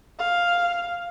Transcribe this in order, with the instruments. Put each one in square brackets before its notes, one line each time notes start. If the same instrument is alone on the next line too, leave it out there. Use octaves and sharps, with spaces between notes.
[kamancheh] F5